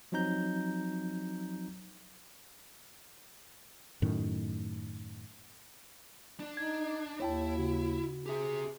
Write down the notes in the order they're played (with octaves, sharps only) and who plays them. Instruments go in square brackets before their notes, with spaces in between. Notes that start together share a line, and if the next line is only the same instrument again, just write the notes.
[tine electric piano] F3 F#3 C4 D#4 A#5 G6
[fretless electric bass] F#2 A2 D#3
[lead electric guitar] D4
[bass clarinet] D#4 [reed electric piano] G#6
[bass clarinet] D#2 [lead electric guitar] E4 [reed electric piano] C#5 G5 A5
[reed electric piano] C#3 F#4
[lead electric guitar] G4 E5 [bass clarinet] G#4